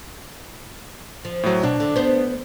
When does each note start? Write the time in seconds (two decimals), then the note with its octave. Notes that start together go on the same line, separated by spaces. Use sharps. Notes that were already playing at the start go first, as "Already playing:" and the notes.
1.25 F3
1.43 A2 F#3
1.63 B2 D4
1.80 D3
1.96 B3 C5